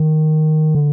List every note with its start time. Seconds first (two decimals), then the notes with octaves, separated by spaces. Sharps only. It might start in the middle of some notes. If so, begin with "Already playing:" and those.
Already playing: D#3
0.75 D3